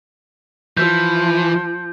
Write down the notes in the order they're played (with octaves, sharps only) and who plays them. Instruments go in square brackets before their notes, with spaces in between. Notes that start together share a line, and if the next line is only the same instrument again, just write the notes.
[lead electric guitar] E3 [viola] F3 [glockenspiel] G6